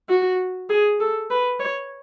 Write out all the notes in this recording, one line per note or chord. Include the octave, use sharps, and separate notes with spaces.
F#4
G#4
A4
B4
C#5